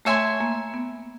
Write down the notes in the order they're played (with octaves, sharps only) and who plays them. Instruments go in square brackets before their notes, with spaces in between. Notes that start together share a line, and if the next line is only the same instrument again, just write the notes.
[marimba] A3 [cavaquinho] C#5 E5 G#5 C6
[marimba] A#3
B3